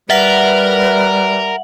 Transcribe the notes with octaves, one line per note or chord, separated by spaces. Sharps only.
G3 A#4 B4 E5 F#5 F#7